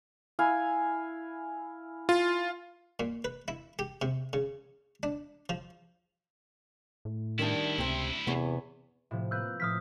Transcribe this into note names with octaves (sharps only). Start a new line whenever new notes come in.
E4 F5 G#5
F4
A#2
B4
E4
G4
C3
C#3
D4
F3
A2
D2 D#3 G3 D4 E4
C#2 C3 C4
E2 C3 B3 C#5
A2 C3 F3
A#3 B4 E6 F#6 G6
A2 F3 A#3 D#6 F6 B6